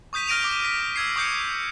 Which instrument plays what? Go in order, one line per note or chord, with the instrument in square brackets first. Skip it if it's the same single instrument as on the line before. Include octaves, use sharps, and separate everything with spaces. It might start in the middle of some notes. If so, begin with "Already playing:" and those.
[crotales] C#6 D#6 G6 B6 D#7
F6 A#6 D7 D#7 F7
D6
B6
E6 G#6 C7
C#6 D#6 G6 C7 C#7